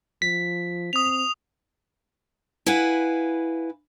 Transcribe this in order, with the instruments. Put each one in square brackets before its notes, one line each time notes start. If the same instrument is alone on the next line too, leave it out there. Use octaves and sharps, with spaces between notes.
[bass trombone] F3 [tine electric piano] B6
[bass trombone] C4 [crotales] D#6 F7
[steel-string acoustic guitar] E4 B4 F5 F#5 G#5